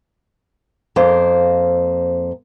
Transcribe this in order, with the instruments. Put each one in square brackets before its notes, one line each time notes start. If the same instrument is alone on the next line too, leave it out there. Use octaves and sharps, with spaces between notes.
[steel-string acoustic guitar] F2 A#3 C5